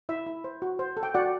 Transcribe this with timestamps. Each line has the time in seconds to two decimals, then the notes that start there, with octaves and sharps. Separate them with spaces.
0.09 E4 E5
0.27 E4
0.44 C5
0.62 F#4
0.79 C5
0.97 A4
1.03 G5
1.14 F#4 D5 F#5